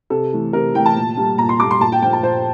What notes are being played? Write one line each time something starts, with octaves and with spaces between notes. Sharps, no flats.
C3 A4
E3 A3
C3 A#4
E3 A3 G5
A5
A#2
G3 A#3
A#2 A#5
C6
G3 A#3 D6
C6
A#2 A5
G5
F3 A#3 G5
A5
A#2 C5